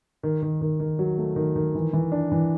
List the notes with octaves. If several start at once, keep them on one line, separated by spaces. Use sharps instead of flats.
D#3
D#3
D#3
D#3
F#3
A3
D#3
D#3
E3
E3
D4
E3